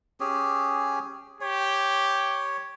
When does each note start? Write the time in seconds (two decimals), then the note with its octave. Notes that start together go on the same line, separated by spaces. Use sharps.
0.20 C#4 G4 G#4
1.41 G4 C#5